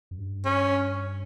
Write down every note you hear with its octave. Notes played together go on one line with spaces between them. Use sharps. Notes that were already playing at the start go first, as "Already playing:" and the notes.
F#2
G2
C#4